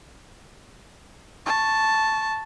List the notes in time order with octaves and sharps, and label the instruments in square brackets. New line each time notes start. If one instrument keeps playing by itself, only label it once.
[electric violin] A5 C#6